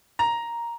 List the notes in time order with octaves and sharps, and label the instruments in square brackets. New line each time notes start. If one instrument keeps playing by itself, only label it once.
[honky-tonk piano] A#5